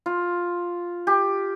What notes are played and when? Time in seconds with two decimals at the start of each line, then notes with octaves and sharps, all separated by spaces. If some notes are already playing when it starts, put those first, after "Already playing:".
0.06 F4
1.07 G4